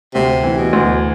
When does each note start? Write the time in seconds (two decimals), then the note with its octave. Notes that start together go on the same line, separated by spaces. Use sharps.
0.14 D2 C3
0.44 E3
0.58 B2
0.73 D2